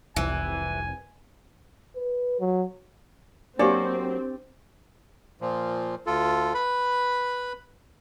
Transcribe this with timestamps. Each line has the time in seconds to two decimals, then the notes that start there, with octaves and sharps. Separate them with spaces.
0.16 F1 C2 E3 G#5
1.96 B4
2.40 F#3
3.59 F#3 A#3 C4 D4 F#4 G4 D5
5.41 A#2 F3
6.06 D2 F4 A4
6.54 B4 B5